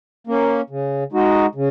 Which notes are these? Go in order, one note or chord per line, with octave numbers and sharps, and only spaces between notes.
A#3 C#4
C#3
G#3 D#4 F#4
C#3